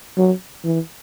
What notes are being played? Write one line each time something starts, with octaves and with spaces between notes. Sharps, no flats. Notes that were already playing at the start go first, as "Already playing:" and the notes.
F#3
E3